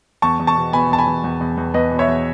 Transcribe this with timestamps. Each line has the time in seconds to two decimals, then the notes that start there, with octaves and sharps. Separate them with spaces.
0.22 E2 A5 C#6
0.39 E2
0.47 A5 C#6
0.56 B2
0.73 B2 G#5 B5
0.90 E2 A5
0.98 G#5 B5
1.07 E2
1.24 E2
1.40 E2
1.57 E2
1.74 E2 B4 D#5
1.91 B2
1.99 C#5 E5
2.08 E2